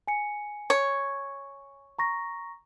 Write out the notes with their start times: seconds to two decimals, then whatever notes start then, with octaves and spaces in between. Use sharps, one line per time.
0.08 G#5 C#7
0.70 C#5
1.99 A#5 C#6 A#6